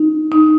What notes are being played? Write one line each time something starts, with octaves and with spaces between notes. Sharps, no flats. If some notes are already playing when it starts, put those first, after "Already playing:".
Already playing: D#4
D#4